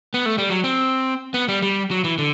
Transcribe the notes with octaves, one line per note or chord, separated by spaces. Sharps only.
B3
A3
G3
F#3
C4
B3
G3
G3
F#3
E3
D3